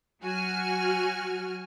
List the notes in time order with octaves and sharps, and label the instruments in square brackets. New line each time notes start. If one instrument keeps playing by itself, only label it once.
[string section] F#3 F#4 G#5 F6